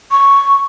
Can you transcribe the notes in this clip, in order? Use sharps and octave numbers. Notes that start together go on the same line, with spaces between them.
C#6